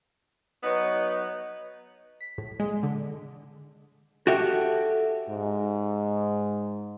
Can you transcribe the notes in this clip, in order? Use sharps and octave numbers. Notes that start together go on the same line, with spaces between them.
F#3 B3 D#4 B4
B6
A2
G#3
D3
F#4 G4 A4 E5
G#2